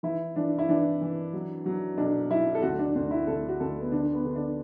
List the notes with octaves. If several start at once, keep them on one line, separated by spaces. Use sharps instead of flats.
E3 E4
E3 D4
E4
E3 D4
E3
F#3
F#3
B1 D4
F#3 E4
A4
D2 F#4
D4
D2 D4
E4
D2 A4
F#4
D2 A4
B3
D3 D4
B3
D3
D4